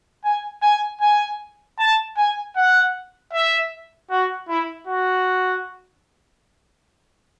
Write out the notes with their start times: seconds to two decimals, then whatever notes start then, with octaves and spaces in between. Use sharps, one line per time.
0.24 G#5
0.62 G#5
1.01 G#5
1.79 A5
2.17 G#5
2.56 F#5
3.33 E5
4.10 F#4
4.48 E4
4.87 F#4